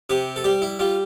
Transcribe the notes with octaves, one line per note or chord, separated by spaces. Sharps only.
C3 G4
A4
G3 G4
E4
G3 F4